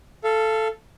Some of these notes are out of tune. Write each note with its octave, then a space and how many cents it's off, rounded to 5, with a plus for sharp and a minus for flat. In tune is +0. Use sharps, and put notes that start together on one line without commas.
A4 +0 F5 -30